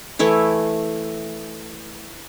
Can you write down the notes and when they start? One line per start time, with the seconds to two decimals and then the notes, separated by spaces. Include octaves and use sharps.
0.19 E3 A3 E4 C#5